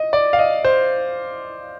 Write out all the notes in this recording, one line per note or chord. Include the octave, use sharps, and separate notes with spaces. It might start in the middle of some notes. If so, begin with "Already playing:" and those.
Already playing: D#5
D5
F5
D#5
C5